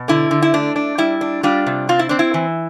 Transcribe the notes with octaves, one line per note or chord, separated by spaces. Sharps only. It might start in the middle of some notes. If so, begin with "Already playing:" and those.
Already playing: B2
D3 E4
D3
E4
A3 D4
D4
G3 E4
D4
G3 D4 F4
C3
C4 F4
E4
C4 D4
E4
E3